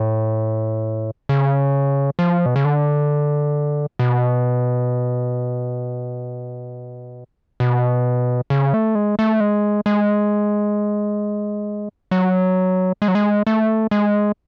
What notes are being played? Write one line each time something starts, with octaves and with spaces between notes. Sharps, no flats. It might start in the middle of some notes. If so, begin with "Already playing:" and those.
Already playing: A2
C#3
F3
B2
C#3
D3
B2
B2
C#3
A3
G#3
A3
G#3
G#3
F#3
G#3
F#3
G#3
A3
G#3